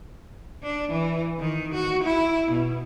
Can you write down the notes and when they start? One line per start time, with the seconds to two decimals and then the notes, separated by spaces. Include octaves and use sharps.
0.63 D4
0.91 E3
1.40 D#3
1.74 F#4
2.04 E4
2.51 B2